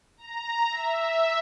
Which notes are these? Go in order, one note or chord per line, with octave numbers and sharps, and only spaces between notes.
A#5
E5